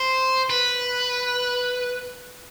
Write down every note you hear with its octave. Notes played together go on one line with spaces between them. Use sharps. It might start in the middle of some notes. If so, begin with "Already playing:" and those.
Already playing: C5
B4